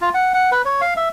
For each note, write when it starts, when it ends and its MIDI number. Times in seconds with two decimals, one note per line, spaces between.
0.01 0.09 65
0.14 0.34 78
0.34 0.51 78
0.52 0.62 71
0.65 0.81 73
0.81 0.94 77
0.97 1.09 76